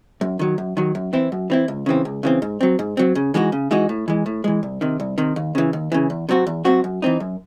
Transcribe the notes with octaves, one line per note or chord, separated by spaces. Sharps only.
F#2
D#3 F#3
F#2
D#3 F#3
F#2
E3 C4 E4
F#2
E3 C4 E4
C#2
C#3 E3 C4
C#2
C#3 E3 C4
G#2
F#3 C4
G#2
F#3 C4
C#3
E3 G#3 D#4 F#4
C#3
E3 G#3 D#4 F#4
A2
E3 G#3
A2
E3 G#3
C2
C3 D#3
C2
C3 D#3
D#2
C#3 E3
D#2
C#3 E3
E2
C3 F#3 C4 F#4
E2
C3 F#3 C4 F#4
F#2
E3 C4 D#4
F#2